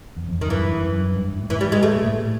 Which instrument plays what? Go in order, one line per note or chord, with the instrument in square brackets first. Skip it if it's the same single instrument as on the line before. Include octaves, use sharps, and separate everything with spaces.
[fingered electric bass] E2
F2
[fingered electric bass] F#2 [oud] D#3
[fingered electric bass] G2 [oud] E3
[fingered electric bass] F#2
G2
A2
[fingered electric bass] G#2 [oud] E3
[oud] G3
G#3
[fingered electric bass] A2 [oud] A3
[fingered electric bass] A#2
A2